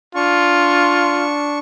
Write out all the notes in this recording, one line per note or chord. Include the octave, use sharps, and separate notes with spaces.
D4 F4 C#6